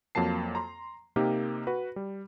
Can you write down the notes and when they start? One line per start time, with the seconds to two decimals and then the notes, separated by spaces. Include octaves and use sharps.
0.15 F2 F#3 A#3 A5 C7
0.55 A#5 C6
1.16 C3 A#3 C4 D#4 G4 A#4
1.67 F#4 B4
1.96 G3